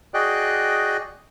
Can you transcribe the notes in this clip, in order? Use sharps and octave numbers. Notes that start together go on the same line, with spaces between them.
F#4 G#4 D5 D#5 G5 F#6